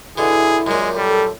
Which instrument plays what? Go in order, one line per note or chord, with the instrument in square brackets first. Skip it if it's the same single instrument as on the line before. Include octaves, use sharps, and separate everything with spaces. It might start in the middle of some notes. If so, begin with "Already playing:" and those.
[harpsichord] B2 D3 [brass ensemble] E4 [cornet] G#4
[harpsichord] F#2 A#2 [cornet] G#3
[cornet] G3 [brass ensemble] A4